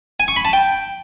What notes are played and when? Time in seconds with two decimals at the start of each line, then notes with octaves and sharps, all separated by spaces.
0.20 G#5
0.28 C#6
0.36 B5
0.45 A5
0.53 G5